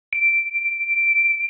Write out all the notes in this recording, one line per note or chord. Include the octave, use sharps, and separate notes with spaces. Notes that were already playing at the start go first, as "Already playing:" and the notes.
D7